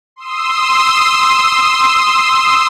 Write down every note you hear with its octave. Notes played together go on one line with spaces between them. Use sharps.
C6 D#6 E6